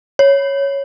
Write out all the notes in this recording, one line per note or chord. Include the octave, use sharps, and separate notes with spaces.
C#5